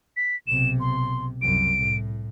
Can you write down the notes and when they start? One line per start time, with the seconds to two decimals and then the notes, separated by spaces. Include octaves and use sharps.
0.17 B6
0.47 B1 C3 E7
0.80 C6
1.42 C2 F#2 D7
1.79 A2